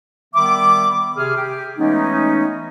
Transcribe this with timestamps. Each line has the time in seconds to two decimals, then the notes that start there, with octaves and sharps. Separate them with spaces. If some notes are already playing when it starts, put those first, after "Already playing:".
0.34 D#3 G3 B3 E5 B5 D6
1.17 C3 G#4 F6
1.35 G4
1.77 E3 G#3 A3 B3 C#4 D#4